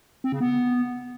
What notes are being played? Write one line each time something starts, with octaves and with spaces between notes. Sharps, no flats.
C4
C#3
B3